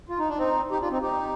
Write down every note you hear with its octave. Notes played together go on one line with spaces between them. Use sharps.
F4
D#4
D4
C4 D#4
D#4 G4
D4 F4
C4 D#4
D#4 G4